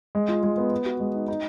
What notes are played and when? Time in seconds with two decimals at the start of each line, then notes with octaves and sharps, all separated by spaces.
0.15 G#3
0.29 F4
0.43 G#3
0.57 B3
0.72 B4
0.86 F#4
1.00 G#3
1.14 D#4
1.28 D#4